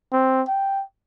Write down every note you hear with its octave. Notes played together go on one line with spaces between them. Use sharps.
C4
G5